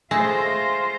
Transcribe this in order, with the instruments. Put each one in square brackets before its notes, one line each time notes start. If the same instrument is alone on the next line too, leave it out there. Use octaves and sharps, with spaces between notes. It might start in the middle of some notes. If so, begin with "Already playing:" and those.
[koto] G#3 A3 A5 [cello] F4 C5 [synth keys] A#6